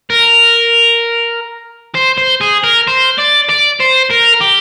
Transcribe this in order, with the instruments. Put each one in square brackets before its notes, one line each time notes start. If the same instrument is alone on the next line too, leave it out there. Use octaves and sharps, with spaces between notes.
[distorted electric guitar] A#4
C5
C5
G#4
A#4
C5
D5
D5
C5
A#4
G4